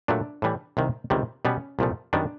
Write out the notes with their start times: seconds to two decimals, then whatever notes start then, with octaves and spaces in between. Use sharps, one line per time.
0.08 A#2 F#3 A3 D4
0.42 A2 E3 G3
0.77 C2 C3 D#3
1.10 C#2 C3 D#3 G3
1.45 B2 G3 B3 C#4
1.79 C2 A#2 F3 A3
2.13 F#2 D#3 G3 B3 D4